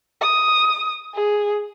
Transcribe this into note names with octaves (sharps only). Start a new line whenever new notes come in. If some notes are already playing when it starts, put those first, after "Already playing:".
D#6
G#4